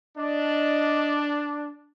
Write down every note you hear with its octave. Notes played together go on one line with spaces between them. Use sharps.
D4 D#5